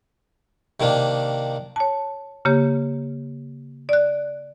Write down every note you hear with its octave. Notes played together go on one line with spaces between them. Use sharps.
C3 D#3 A#3 D4
C#5 A5
C#3 A#3 G4 C#5
D5 F#6